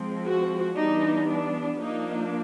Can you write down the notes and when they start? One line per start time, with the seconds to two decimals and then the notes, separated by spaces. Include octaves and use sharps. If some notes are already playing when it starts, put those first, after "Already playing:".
Already playing: F3 G#3 C4
0.27 F#4
0.77 E3 G3 B3 D4 D#4
1.28 D4
1.78 F3 A#3 D4 D#4